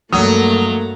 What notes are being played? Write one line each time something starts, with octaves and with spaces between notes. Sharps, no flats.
G2 F#3 A3 A#3 A#5 D#6